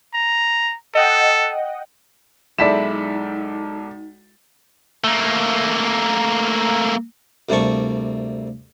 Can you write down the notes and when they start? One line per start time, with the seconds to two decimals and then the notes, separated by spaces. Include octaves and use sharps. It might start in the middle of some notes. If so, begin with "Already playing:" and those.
0.14 A#5
0.95 A4 D#5 F#5 G5
2.58 B1 G#3 D#4 E4 A4 D5 B6 E7
5.04 A3 A#3
7.49 D2 C3 G3 A#3 A5 C#6